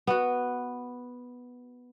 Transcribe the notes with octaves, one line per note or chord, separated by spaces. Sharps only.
B3 F#4